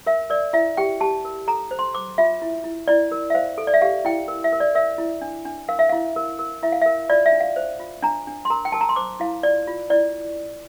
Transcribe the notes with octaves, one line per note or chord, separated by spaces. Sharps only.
A#4 E5
A#4 D5
E4 E5
G4 G5
G4 A5
A#4
A4 A#5
C5
C6
C5 D6
F4 E5
E4
E4
E4 D5
A#4
E5
C5 F5
A4
D5
E5
G4 F5
E4 G5
A#4
E5
A#4
D5
A#4 E5
E4
D4
D4
A#4 F5
E5
E4 F5
A#4
A#4
E4 E5
F5
A#4 E5
F4 D5
E5
D4
F5
C5
F4
D4 A#5
D4
C6
A#4 A#5
G5
A#4 A5
A#5
C6
C5 D6
E4 F5
F4 D5
F4
E4 D5